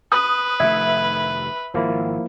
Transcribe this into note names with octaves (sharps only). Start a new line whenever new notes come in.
B4 D#6
F1 D#3 A3 E5 G#6
G#1 F3 A#3 E4